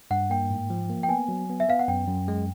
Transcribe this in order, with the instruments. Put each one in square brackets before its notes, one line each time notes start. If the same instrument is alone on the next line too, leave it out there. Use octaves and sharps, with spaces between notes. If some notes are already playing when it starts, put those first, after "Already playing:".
[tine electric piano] G2 [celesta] F#5
[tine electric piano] A#3 [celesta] G5
[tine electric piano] G#2
F3
A#3
[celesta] G5
[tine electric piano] B3 [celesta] G#5
[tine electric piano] F#3
B3
[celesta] E5
[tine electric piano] B3 [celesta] F5
[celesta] F#5
[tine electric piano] F#2 [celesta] G5
[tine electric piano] F#2
G#3